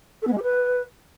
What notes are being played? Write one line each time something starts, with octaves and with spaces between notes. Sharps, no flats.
A4
B3
G#3
G4
B4